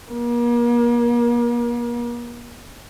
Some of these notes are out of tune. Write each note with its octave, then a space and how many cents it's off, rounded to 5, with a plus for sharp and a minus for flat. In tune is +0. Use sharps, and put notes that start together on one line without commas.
A#3 +40